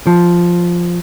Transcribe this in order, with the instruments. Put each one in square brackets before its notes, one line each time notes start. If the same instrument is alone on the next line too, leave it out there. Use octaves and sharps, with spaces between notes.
[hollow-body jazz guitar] F3